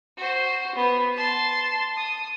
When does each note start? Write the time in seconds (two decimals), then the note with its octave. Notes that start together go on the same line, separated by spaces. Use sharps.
0.18 F#4 C5
0.75 B3
1.16 A5 C6
1.96 D#6